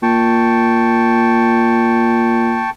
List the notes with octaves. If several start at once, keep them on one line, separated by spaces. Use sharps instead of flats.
A#2 G5 A5 C#6